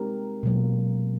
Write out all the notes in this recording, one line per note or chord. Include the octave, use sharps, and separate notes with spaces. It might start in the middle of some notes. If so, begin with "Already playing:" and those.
Already playing: G#3 C4 D#4 G4 A#4
B2 F#3 A#3